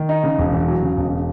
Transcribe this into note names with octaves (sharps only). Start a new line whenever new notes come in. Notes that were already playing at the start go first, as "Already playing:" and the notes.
Already playing: D#3
D#4
C#3
E1
E2
F#3
C#3
E1